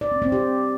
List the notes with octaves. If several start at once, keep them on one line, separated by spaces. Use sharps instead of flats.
D5
C4
C4
G4